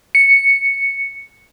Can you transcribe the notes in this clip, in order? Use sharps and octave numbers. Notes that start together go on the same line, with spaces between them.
C#7